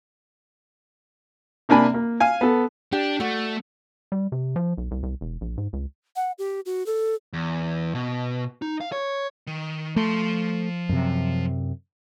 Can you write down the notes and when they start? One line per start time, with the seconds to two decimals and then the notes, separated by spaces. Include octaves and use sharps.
1.69 C3 A#3 D4 G#5 B5
1.94 A#3
2.20 F5 G#5
2.41 B3 A4
2.92 D4 G4
3.20 A3 F#4 D5
4.12 G3
4.32 C3
4.56 F3
4.78 B1
4.91 C2
5.03 C2
5.21 E1
5.41 A#1
5.57 G#2
5.73 C#2
6.16 F#5
6.38 G4
6.66 F#4
6.86 A4
7.33 E2
7.95 B2
8.62 D#4
8.81 F5
8.92 C#5
9.47 D#3
9.96 F3 A3 C6
10.89 F#2 C3